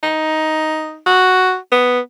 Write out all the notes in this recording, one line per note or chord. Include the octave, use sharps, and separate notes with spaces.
D#4
F#4
B3